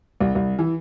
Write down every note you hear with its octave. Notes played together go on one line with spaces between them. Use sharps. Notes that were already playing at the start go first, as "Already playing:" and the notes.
C2
C2
E3